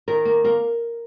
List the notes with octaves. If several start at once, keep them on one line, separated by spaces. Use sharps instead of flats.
D#3 A#4
A#3
A#3 A#4